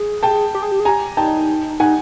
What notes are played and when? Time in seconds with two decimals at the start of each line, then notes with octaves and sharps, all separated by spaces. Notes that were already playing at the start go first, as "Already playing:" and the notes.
Already playing: G#4
0.23 G5 A5
0.55 G4
0.62 G#4
0.72 G4
0.80 G#4
0.85 G4 G#5 A#5
1.17 D#4 G5 A5
1.80 D#4 F#5 G#5